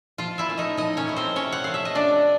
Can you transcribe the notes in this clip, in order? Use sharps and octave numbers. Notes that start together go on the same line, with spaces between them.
F3 F4 F5
E4 E5
A3 C#4 E4
D#4 D#5
F3 D#4 D#5
C#4 C#5
A3 C#4 E4 C#5
C4 C5
C3 C#4 C#5
F#5
F3 A3 F5
E5
D#5
C3 D4 D5